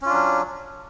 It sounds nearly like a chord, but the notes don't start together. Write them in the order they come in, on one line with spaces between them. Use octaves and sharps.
C#4 F4 D4 F#3